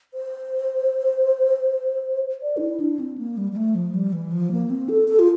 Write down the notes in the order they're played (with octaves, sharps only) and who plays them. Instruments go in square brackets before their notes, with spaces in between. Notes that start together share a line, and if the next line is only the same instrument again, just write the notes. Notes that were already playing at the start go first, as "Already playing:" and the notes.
[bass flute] C5
D5
D4
E4
D4
C4
A#3
G3
G3
A3
F3
G3
E3
F3
A#3
C4
A4
A4
F4